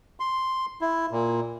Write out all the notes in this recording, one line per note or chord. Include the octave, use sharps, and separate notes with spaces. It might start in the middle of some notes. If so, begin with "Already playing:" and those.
C6
E4
A#2